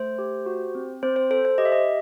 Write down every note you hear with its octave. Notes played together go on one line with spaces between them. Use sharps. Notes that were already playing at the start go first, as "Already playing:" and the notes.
Already playing: A3 C5
G4
F#4
C4
C4 C5
C5
A4 C5
C5
G4 D#5
E5
D#5